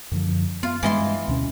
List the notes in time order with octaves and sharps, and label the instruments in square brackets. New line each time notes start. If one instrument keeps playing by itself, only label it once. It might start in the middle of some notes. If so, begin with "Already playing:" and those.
[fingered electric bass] F#2 D3 F3
[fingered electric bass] B3 [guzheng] F4
[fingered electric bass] G2 G#3 [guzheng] E3 D#5 C6
[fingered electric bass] D2 B2 C#4